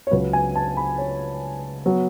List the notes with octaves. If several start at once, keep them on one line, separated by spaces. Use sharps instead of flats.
C#5
C#2 C#3 F#3 B4
G#5
A5
B5
C#5
F#3 B3